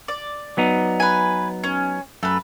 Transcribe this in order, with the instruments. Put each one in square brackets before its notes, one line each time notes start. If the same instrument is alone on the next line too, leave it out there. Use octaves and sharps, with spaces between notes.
[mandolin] D5
[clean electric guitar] F#3 B3 D#4
[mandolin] B4 G#5
C#4
[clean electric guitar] F#2 [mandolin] A3 B4